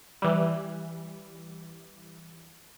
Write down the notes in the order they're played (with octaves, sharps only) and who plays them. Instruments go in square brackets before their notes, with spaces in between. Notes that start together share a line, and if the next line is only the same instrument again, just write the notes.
[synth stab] E3 G3